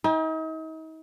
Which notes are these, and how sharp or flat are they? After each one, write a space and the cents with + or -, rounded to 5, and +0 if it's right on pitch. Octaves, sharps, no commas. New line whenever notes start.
D#4 +40 G5 +45